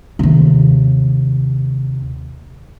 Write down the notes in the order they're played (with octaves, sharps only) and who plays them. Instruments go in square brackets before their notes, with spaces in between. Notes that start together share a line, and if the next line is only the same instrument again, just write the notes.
[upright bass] D#2 C3